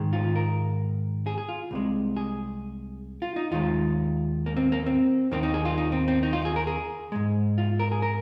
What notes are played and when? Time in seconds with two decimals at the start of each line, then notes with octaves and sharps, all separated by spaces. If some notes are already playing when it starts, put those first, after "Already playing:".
Already playing: G#2 D#3 G#3
0.13 F4
0.36 A#4
1.26 G#4
1.38 G#4
1.49 F4
1.71 C2 C3 G#3
2.17 G#4
3.22 F4
3.36 D#4
3.51 D#2 D#3 G#3 F4
4.46 A#3
4.57 C4
4.72 A#3
4.86 C4
5.31 D#2 D#3 A#3 C4
5.43 D#4
5.54 G#4
5.65 F4
5.78 D#4
5.92 C4
6.08 C4
6.23 D#4
6.33 F4
6.45 G#4
6.56 A#4
6.67 G#4
7.12 G#2 G#3
7.58 F4
7.79 A#4
7.92 G#4
8.02 A#4